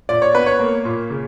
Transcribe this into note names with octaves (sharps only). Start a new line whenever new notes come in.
A#2 D5
C#5
B3 B4
C#5
A#3
A#2
C#3